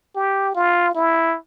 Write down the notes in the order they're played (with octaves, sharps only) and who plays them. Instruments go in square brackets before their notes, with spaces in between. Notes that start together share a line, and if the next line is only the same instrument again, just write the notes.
[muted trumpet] G4
F4
E4